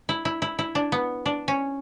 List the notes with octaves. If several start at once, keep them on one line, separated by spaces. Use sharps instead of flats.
E4
E4
E4
E4
D4
B3
D4
C#4